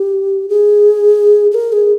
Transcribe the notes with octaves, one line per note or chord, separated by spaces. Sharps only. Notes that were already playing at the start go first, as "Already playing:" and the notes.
Already playing: G4
G#4
G#4
A#4
G#4